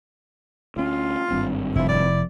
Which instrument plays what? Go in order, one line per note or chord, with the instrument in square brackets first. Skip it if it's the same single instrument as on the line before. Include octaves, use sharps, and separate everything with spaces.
[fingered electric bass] D2 C#4 [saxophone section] F4
[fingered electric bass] G#1 G2 C4
[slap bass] F1 [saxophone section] F3 E4
[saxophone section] E4 D5